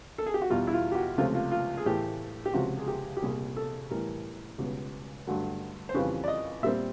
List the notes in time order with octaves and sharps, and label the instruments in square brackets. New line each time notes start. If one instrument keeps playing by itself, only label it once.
[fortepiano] A4
G#4
G4
F#4
E2 B2 G3 F4
E4
F4
G4
F#4
C#2 C3 F3 A3 F4
F4
F4
G#4
A2 E3 A3 G4
G4
C#2 C3 F3 F#4
G#4
G4
G4
C2 A#2 G3 G#4
A4
A2 E3 G3 A#4
C#2 B2 G3 B3
G2 D3 F#3 A3
C5
F2 C#3 E3 G3 B4
D5
D#5
A#2 G3 C4 E5